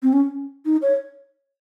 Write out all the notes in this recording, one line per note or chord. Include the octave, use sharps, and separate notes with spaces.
C4
C#4
D#4
C#5